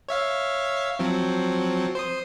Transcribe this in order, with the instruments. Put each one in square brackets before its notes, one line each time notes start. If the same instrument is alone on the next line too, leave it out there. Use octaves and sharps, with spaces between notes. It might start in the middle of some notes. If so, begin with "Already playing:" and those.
[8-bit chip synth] C#5 E5 F5
F3 F#3 C4
C5 C6 D#6